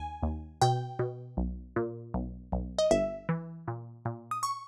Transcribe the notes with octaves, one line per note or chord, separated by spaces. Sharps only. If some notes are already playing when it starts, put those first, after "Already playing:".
Already playing: D#2 G#5
D#2
B2 G5
B2
B1
A#2
B1
B1
D#5
G1 E5
E3
A#2
A#2
D#6
C#6